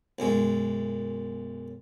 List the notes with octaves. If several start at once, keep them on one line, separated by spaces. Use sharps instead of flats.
B1 F#2 G#3